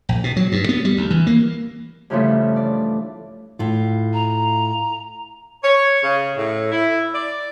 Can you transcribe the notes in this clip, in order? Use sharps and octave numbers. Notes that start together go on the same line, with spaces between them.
A#1
B2
F#3
G2
B3
G3
D2
E3
A#3
G2 C#3 E3 F3 A3
D5
A2 F4
A#5
C#5
C#3
A2
E4
D5